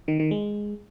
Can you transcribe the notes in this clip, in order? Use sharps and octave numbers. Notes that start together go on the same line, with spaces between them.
D#3
D#3
G#3